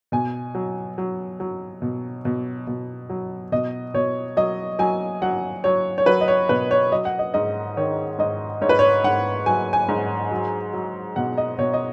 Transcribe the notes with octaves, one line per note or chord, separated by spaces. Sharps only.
B2 G#5
F#3
F#3
F#3
B2
B2
B2
F#3
B2 D#5
B2 C#5
F#3 D#5
F#3 G#5
F#3 F#5
F#3 C#5
C#5
F#3 B4
D#5
C#5
B2 B4
C#5
F#3 D#5
F#5
D#5
G#2 D#5
D#3 C#5
G#2 D#5
G#2 C#5
B4
C#5
G#2 F#5
F#3 G#5
G#5
G#2
F#3
F#3
B2 F#5
D#5
B2 C#5
D#5